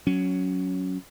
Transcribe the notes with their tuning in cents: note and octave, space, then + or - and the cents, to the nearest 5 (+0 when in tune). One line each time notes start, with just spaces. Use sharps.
F#3 +0 C#4 +10